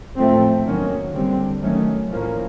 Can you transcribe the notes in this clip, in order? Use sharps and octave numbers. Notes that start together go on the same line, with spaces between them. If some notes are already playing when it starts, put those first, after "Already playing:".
A2 F3 A3 C4
D#3 F#3 A#3 C#4
D3 G3 C4
D#3 F#3 A3 C#4
A2 F3 A#3 C#4